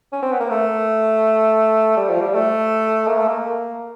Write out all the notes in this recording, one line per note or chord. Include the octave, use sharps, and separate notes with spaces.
C#4
C4
B3
A#3
A3
G3
F3
G3
A3
A#3
A3
A#3